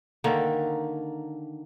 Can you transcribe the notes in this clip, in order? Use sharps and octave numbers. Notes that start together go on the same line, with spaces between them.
D3 D#3 A#3